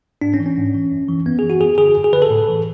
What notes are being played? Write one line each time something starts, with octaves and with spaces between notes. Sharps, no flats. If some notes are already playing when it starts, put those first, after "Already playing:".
G#2 D4
C#4
E3
C#4
G#2
E3
F#2
E3
F#2 B3
E3 G#4
F#4
F#2 G#4
D3 G#4
F#2
G#4
D3 B4
A4
A2
E3